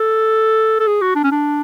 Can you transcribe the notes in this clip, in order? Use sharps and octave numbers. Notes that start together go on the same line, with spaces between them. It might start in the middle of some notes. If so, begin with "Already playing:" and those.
Already playing: A4
A4
G#4
F#4
D4
C#4
D4